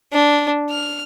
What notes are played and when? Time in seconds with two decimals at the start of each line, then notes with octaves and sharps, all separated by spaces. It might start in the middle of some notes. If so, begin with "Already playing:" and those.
0.12 D4
0.70 F6